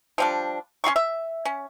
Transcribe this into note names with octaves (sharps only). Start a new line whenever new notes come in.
F3 G3 D4
C#4 F#4 C6 C#6
E5
C#4